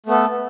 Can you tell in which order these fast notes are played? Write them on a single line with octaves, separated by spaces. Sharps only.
A3 B3 A4